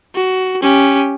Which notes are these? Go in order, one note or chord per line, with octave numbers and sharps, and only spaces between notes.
F#4
C#4 G4